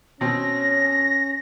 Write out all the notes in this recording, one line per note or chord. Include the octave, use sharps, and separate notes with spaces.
B2 C4 C#4 A#6